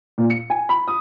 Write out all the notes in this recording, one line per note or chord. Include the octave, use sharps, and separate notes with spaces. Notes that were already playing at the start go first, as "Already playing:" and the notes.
A#2
C#7
G#5
B5
D#6